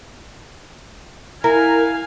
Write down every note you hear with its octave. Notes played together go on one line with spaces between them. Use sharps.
E4 A#4 F5 G#5